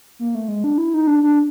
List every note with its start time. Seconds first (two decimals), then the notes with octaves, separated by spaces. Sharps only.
0.19 A#3
0.35 A3
0.48 G#3
0.64 D4
0.78 E4
0.94 D#4
1.07 D4
1.23 D4